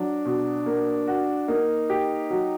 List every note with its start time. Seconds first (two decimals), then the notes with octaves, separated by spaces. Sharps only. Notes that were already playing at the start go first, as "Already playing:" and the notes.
Already playing: F#3 D4
0.26 B2
0.66 A#3
1.08 F#4
1.48 A#3 D#4
1.90 G4
2.30 F#3